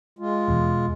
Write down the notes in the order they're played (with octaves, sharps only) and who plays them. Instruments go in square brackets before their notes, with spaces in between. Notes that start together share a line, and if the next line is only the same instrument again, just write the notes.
[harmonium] G#3 F4
[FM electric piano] E2 B2